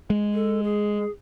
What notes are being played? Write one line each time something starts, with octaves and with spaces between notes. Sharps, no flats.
G#3
A4
G#4